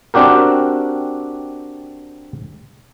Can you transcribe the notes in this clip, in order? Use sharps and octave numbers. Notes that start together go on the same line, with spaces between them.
C4 D4 F#4 G4 A#4